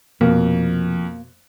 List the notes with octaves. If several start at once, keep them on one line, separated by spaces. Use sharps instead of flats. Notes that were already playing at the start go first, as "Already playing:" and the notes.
F1 F2 B2 F3 A#3